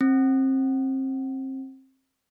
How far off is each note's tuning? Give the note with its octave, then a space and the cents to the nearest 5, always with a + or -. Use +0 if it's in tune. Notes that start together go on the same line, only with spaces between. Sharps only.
C4 +25